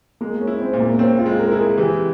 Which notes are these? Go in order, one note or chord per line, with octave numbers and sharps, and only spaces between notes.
G#3 A#3
C#4
E4
C4
A#2
A#3
C4 C#4
F4
G#3
A#4
E4
G#4
E3 G4